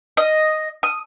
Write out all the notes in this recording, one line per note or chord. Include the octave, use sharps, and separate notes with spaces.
D#5
D#6